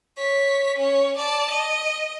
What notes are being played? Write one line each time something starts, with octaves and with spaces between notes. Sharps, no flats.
C#5 B6
C#4 C#5
D5 A5
D#5